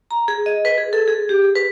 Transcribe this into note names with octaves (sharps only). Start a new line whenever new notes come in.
A#5
G#4
D#5
B4
G#4
A4
G#4
G4
G#4
B4